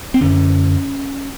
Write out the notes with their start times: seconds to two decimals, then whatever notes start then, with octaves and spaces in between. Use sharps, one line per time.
0.14 C4
0.21 F#2 D3 C#4